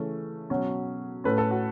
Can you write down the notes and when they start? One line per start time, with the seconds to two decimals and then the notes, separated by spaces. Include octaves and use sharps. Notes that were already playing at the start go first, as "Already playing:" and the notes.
Already playing: C#3 E3 A3 C#4
0.50 B2 F#3 C#4
1.24 A2 A3 C#4 B4
1.38 A4
1.51 F#4